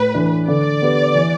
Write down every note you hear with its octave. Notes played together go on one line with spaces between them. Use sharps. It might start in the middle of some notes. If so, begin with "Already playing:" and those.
Already playing: A2 B4
E3 A3 D4
D3 D5
B3 G4 B4
E3